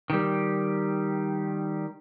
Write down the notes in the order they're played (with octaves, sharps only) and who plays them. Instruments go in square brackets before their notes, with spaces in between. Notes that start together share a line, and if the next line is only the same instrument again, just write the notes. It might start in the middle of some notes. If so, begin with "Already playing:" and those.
[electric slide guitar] D#3 G3